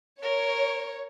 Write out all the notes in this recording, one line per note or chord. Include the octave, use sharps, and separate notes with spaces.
A#4 C#5